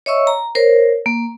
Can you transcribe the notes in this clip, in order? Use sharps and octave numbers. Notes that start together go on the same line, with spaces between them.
C#5 D#5 E5 C#6 E6
A#5
A#4 C5 C#5
A#3